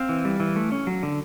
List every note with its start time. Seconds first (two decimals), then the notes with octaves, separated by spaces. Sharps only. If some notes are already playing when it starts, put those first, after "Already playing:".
Already playing: C4 F5
0.09 E3
0.25 G3
0.40 E3
0.56 A3
0.72 C#4
0.87 F#3
1.03 D3